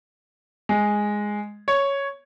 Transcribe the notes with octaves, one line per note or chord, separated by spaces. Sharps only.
G#3
C#5